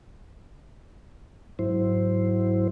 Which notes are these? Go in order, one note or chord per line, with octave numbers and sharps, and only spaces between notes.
G#2 F#3 E4 C5